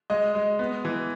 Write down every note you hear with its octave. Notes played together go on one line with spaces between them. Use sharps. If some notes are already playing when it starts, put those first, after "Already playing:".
G#3 D#5
G#3
B3
E3